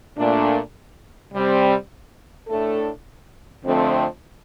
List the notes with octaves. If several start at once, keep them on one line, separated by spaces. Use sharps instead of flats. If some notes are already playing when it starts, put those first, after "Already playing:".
A#2 A3 D4
C3 G3 C4
A2 A3 D4 A4
F2 D3 F3 A3 C4